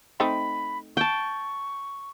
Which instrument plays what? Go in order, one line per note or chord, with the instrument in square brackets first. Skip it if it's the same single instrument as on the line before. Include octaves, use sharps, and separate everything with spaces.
[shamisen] A3 C4 D#4 [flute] B5
[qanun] G5 A5 [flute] C#6